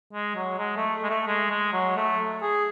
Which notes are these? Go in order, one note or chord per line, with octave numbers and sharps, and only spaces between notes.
G#3
F#3
G#3
A3
G#3
A3
G#3
G#3
F#3
A3
G#4